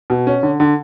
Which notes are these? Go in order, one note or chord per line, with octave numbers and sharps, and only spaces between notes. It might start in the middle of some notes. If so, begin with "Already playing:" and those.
B2
C#4
D3
D3